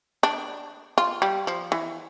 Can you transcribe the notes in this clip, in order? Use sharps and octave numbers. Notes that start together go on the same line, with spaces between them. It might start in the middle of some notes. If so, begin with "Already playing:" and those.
D4
F4
G3
F3
E3